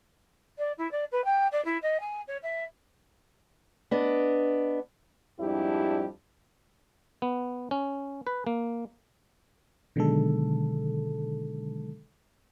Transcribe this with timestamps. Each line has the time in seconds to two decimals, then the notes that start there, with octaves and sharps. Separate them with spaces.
0.58 D5
0.77 E4
0.91 D5
1.11 B4
1.24 G5
1.52 D5
1.64 E4
1.82 D#5
2.00 G#5
2.27 C#5
2.42 E5
3.91 B3 D4 D#5
5.40 F2 G#2 G3 D4 E4 G4
7.22 B3
7.71 C#4
8.27 B4
8.47 A#3
9.96 B2 D3 D#3 F#3 G#3 A4